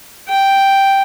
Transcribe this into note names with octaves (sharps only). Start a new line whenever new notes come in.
G5